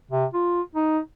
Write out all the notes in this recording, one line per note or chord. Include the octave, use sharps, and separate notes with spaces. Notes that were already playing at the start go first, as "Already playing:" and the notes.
C3
F4
D#4